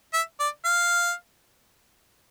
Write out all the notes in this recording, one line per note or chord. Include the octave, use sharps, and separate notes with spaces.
E5
D5
F5